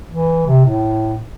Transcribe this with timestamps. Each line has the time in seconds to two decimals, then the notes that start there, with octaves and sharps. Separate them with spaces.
0.11 E3
0.47 C3
0.65 A2